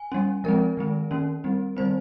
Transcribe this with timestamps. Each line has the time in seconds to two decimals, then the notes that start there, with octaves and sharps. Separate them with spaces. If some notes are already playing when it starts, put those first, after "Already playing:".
Already playing: G#5
0.12 G3 C#4
0.44 F3 G#3 C4 A#4
0.77 D#3 G#3 C4
1.11 D#3 A#3 C#4
1.44 G3 C4
1.77 D#3 G3 C4 C5